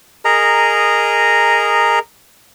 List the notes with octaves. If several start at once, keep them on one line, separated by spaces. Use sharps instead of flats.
G#4 A#4 D#5 A#5